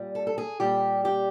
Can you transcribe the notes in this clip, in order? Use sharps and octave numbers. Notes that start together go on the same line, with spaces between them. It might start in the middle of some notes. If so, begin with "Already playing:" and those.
Already playing: A#2 G3
A4
A4
G#4
A#2 G3 G4
G4